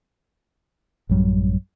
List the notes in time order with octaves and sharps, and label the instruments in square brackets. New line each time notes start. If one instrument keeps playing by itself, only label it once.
[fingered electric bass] A1 F#2 F#3 G3